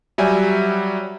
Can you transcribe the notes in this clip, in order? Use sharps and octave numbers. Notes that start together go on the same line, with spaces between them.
F#3 G3 E5 G#5